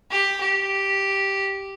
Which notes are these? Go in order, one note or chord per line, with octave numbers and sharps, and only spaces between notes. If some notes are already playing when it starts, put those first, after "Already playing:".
G4
G4